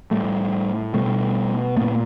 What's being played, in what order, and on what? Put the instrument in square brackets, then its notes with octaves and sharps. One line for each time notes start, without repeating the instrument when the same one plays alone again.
[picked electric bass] A2 G3 A3
B2 G3 A3
A#2 A3 B3